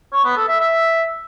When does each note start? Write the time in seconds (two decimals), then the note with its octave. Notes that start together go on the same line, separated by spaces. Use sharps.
0.13 C#5
0.25 B3
0.37 A4
0.48 E5
0.60 E5